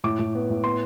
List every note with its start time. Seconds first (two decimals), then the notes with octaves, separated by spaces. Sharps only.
0.04 A2 D6
0.19 A2
0.35 B3
0.50 A2
0.64 B3 C6